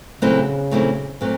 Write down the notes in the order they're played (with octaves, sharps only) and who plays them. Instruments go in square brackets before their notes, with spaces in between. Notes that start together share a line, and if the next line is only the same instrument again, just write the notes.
[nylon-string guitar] A#2 F#3 A3 C4 E4 [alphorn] C#3
[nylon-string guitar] A#2 F#3 A3 C4 E4
A#2 F#3 A3 C4